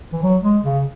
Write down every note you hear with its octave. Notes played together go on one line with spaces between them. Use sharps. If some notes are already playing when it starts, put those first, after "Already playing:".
E3
F#3
G#3
C#3